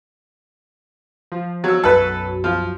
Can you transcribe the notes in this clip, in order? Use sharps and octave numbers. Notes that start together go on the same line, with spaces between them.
F3
F#3 E6
B1 F#2 F#3 A4 B4
F3